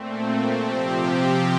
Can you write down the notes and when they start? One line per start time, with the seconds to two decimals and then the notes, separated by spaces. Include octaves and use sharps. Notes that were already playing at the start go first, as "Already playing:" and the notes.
Already playing: A#2 A3 C4
0.66 C3 F3 C4 G4